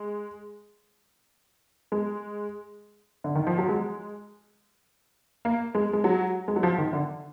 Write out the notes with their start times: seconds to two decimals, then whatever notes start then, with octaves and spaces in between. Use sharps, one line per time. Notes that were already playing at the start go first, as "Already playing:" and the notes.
Already playing: G#3
1.92 G#3
3.24 D3
3.35 D#3
3.47 F3
3.58 F#3
3.69 G#3
5.45 A#3
5.75 G#3
5.93 G#3
6.04 F#3
6.48 G#3
6.56 F#3
6.63 F3
6.78 D#3
6.93 D3